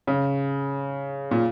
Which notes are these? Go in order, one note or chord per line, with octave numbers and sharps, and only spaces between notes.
C#3
A#2